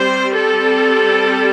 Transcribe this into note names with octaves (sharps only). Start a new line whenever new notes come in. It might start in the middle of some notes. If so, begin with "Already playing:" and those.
Already playing: G3 C4 C5
A4